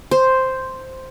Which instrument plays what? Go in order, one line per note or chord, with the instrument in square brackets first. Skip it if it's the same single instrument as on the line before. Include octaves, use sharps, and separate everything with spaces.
[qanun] C5